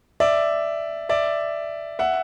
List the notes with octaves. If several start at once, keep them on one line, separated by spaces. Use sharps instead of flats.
D5 E5
D5 E5
E5 F#5